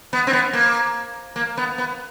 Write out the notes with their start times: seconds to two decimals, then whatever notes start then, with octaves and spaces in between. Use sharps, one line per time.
0.13 B3
0.27 C4
0.33 B3
0.53 A#3
1.36 A#3
1.57 B3
1.78 B3